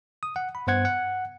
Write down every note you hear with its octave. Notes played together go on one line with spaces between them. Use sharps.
D#6
F#5
B5
G2 B3 C5 F#5 G#6
F#5